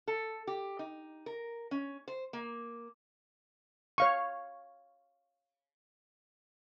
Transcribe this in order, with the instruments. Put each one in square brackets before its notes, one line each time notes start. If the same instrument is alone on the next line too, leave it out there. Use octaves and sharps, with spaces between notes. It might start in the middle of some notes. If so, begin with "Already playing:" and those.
[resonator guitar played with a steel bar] A4
G4
D#4
A#4
C#4
C5
A#3
[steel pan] C#5 F5 C#6